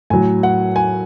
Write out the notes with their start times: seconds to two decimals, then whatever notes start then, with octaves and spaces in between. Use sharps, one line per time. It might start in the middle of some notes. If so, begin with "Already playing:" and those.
0.10 A2 F#3 G#5
0.43 F#5
0.76 G#5